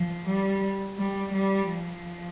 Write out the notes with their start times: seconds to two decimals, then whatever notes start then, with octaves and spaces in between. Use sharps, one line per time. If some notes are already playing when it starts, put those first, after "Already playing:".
Already playing: F3
0.25 G3
0.97 G3
1.32 G3
1.68 F3